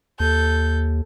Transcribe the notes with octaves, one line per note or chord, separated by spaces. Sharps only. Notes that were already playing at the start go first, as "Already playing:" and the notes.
D#2 A4 G6